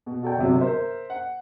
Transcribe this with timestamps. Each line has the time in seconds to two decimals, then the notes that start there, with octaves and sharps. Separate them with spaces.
0.06 B2
0.23 F#4 A4 D5 G5
0.38 G1 C3 F#3
0.61 A#4 C5 E5
1.10 F#5